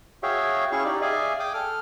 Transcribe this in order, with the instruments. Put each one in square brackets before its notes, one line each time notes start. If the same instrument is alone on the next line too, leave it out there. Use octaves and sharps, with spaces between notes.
[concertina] F#4 G#4 C#5 E5 F5 G5
C#4 E4 G#4 F5 C#6
D#4 G4 D5
G#4 D5 E5 F5 G#5
G5 D6 D#6
A4 F6